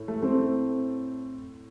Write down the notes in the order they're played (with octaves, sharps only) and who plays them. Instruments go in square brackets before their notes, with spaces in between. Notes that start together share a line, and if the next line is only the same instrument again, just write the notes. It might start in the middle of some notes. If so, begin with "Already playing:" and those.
Already playing: [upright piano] A2
[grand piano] A3
A3 C4